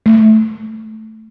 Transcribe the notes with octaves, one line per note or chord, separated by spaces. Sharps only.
A3